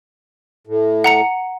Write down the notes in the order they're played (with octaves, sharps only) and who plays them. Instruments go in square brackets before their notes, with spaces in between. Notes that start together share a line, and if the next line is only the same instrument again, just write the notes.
[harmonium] A2
[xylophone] F#5 A#5 C#7